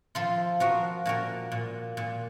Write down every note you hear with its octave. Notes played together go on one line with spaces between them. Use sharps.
F3 F4 A4
F3 F#4 A#4
A#2 F#4 A#4
A#2
A#2